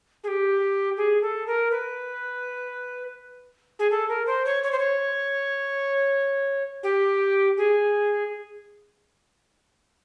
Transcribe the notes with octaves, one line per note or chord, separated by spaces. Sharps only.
G#4
G4
G#4
A4
A#4
B4
G#4
A4
A#4
C5
C#5
C#5
C5
C#5
G4
G#4